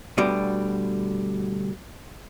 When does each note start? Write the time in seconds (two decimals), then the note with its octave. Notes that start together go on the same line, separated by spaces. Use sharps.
0.18 D2 B2 D3 G3